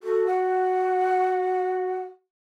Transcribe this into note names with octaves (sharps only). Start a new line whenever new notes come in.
F#4 A4
F#5